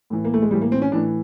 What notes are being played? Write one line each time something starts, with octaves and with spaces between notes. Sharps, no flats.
A2 E3
A#3
A3
G#3
A2 E3 G3
A#3
C4
C#4
A2 E3 D4